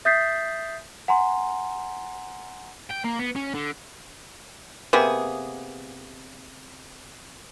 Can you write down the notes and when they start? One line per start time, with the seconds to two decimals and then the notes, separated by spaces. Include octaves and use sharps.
0.05 E5 D#6 G6 A6 B6 C7
1.08 F#5 G#5 A#5 C6
2.91 G5
3.05 A#3
3.19 B3
3.35 C#4
3.54 D3
4.93 C3 A#3 B3 G#4